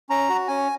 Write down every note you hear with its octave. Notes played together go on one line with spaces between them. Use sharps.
C#4 A#5
F#4
C#4 G#5